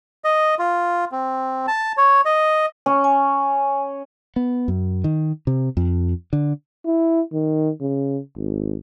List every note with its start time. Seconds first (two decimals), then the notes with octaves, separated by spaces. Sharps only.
0.24 D#5
0.59 F4
1.12 C4
1.68 A5
1.97 C#5
2.25 D#5
2.86 C#4
3.04 G#5
4.36 B3
4.68 F#2
5.04 D#3
5.47 C3
5.77 F2
6.33 D3
6.85 E4
7.33 D#3
7.81 C#3
8.36 G#1